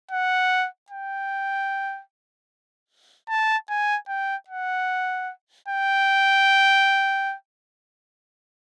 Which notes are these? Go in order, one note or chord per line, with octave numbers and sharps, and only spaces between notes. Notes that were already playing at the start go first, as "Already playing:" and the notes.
F#5
G5
A5
G#5
G5
F#5
G5